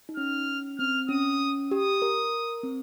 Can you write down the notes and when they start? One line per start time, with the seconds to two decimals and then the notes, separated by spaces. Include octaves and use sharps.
0.09 D#4
0.16 C#4 F6
0.79 C4 F6
1.09 C#4 D#6
1.71 G4 D#6
2.02 A#4
2.63 C4